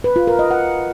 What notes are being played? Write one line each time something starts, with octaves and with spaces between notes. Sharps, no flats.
B4
F4
A#4
D#5
F#5